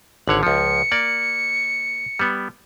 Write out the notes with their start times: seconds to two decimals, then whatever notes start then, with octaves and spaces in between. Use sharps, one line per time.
0.28 G#1 D3 C#5 F#7
0.43 C#2 F3 C#7
0.92 A#3 D5
2.19 G3 B3